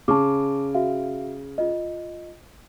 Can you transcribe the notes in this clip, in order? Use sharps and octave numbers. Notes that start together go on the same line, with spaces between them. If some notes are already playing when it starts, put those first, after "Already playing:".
C#3 A5 C#6 D6
F#4 E5 F5
F4 D#5